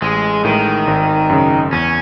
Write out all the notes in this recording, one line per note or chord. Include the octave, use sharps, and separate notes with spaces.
A1 G#3
A2 D#3 G#3
G#1
F#2 C#3
E2 C#4